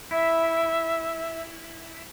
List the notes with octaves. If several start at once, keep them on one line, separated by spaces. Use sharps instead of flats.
E4 E5